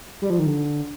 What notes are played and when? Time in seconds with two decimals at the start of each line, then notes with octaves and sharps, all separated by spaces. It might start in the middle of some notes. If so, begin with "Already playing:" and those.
0.22 G3
0.30 F3
0.39 D#3
0.46 D3